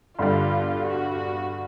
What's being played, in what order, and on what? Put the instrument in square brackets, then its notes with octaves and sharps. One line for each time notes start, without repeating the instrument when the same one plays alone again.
[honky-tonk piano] G2 D3 G3 [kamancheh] F4
[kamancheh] F#4